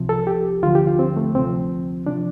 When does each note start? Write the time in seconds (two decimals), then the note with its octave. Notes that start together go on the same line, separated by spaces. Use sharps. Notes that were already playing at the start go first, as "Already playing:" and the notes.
Already playing: C2 C3 F3
0.09 A4
0.27 G4
0.63 D2 D3 F3 F4
0.75 G4
0.87 F4
0.99 C4
1.17 A3
1.35 D2 C3 F3 C4
2.06 C3 F3 D4